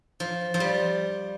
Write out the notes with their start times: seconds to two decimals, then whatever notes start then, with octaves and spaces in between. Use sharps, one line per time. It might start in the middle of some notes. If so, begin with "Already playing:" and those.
0.20 F3
0.54 F3
0.60 G3